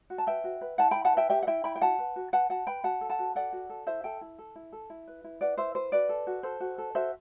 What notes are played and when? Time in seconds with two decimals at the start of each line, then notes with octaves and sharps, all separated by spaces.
0.10 F#4
0.18 A5
0.27 B4 E5 G5
0.44 F#4
0.61 B4
0.78 E4 F#5 A5
0.91 E4 G5 B5
1.05 F#5 A5
1.13 B4 E5 G5
1.30 G4 E5 G5
1.43 F#5
1.47 E4 E5 G5
1.64 E4 G5 B5
1.75 G5
1.81 F#4 F#5 A5
1.99 B4
2.16 F#4
2.33 B4 F#5 A5
2.49 F#4 F#5 A5
2.67 B4 G5 B5
2.84 F#4 F#5 A5
3.01 A4
3.10 F#5 A5
3.19 F#4
3.35 A4 D5 F#5
3.53 F#4
3.70 A4
3.87 E4 C5 E5
4.04 A4 E5 G5
4.21 E4
4.39 A4
4.56 E4
4.73 A4
4.90 E4
5.07 B4
5.24 E4
5.41 B4 D5 F#5
5.57 E4 C5 E5
5.75 B4 C5
5.92 F#4 B4 D5
6.09 A4
6.27 F#4
6.43 A4 C5
6.60 F#4
6.78 A4
6.95 F#4 C5 E5